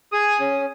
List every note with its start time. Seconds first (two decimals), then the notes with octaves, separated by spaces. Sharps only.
0.12 G#4 D#6
0.40 C#4